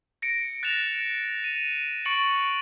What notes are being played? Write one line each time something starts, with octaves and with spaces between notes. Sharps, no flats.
A#6 C#7 D7
F#6 A6 A#6 D7 E7 F7
D#7
C#6 A6 C#7 D7 F#7